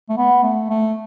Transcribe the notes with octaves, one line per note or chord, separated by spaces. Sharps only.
A3
B3
A3
A3